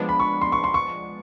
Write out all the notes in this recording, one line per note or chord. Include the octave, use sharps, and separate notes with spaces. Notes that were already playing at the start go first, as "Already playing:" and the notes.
Already playing: F3 G#3 B3 D4
B5
C#6
C6
C#6
C6
C#6